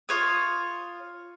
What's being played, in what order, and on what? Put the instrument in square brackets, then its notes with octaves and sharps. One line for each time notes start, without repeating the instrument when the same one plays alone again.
[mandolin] F4 C#5 D#6